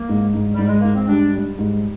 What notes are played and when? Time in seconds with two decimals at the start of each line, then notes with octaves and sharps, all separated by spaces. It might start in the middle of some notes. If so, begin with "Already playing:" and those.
Already playing: A#3
0.09 G#2
0.34 G#2
0.54 G3
0.59 G#2
0.68 G#3
0.81 G#2 A#3
0.95 C4
1.08 G3 D4
1.34 G3
1.59 G#2